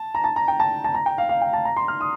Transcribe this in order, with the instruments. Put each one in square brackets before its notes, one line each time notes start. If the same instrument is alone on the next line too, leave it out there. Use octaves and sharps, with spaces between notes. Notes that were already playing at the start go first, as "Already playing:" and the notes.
Already playing: [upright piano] A5
A#5
A5
A#5
G5
A5
A5
A#5
G5
F5
F5
G5
A5
A#5
C6
F6
D#6